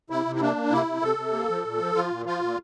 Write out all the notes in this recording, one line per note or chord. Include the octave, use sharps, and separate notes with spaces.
C3 E4
C3
E4
A#3 D4
A#3
C3 E4
C3
C3 A4
C3
A#3
F3
A#2
F3
F3 F4
A#2
F3 F4
A#2